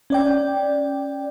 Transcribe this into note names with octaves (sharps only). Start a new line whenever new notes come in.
C#4 D5 G5